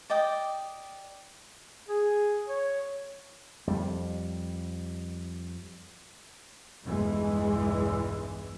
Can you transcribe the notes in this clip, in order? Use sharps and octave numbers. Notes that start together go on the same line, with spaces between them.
D5 D#5 G5
G#4
C#5
F2 G3
B1 E2 G2 E3 G#3